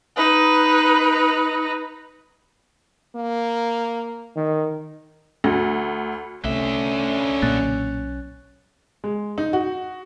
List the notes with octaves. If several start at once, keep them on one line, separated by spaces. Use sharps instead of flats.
D#4 B4
A#3
D#3
D2
C2 D3 A3 C#4 E5
B1 A#2 A#3 D4 F#6 A6
G#3
D#4
F#4